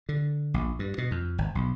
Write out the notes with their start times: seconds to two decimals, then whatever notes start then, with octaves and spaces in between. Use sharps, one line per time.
0.09 D3
0.54 A#1
0.79 G2
0.98 B2
1.11 F2
1.38 G#1
1.55 B1